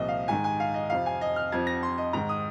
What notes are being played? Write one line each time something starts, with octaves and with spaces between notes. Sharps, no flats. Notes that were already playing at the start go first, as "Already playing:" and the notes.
Already playing: C2 A#2 F3 D#5
F5
G#2 D#3 G#5
G#5
F5
D#5
F2 C3 F3 F5
G#5
D#5
F6
F2 F3 G#6
A#6
C6
D#5
G#2 D#3 A#5
D#6